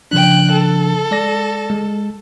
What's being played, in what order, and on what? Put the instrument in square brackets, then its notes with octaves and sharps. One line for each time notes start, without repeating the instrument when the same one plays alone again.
[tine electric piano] C#3 F3 D4 [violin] G5 F#6
[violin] A4
[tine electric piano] G#3 D5 A#6
G#3